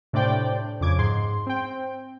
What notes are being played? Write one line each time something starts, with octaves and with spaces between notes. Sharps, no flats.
A2 C3 D4 C5 D5 G5
F2 C#3 D6 G#6
G#2 C6
C4 G5